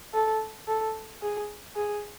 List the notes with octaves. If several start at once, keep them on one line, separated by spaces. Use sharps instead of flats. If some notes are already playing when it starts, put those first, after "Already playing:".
A4
A4
G#4
G#4